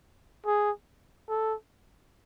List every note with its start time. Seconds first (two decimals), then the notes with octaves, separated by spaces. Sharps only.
0.46 G#4
1.29 A4